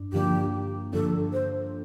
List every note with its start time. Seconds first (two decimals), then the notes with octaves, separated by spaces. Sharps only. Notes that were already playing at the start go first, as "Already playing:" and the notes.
Already playing: G2 D4
0.13 G2 D3 F3 A#3 D4 G4
0.93 G2 D3 F3 A#3 D4 A4
1.33 C5